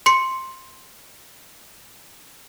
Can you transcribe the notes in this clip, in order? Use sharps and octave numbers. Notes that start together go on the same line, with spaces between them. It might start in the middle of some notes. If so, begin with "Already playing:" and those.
C6 C#7